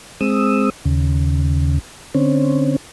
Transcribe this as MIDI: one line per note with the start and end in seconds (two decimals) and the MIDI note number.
0.21 0.70 56
0.21 0.70 60
0.21 0.70 87
0.21 0.70 88
0.85 1.79 39
0.85 1.79 49
2.15 2.76 50
2.15 2.76 60
2.15 2.76 61